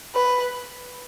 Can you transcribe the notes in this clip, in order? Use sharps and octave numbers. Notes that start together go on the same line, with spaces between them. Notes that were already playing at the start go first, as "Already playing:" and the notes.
B4